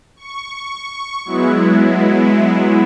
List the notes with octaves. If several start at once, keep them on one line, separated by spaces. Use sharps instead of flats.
C#6
F#3 G#3 B3 E4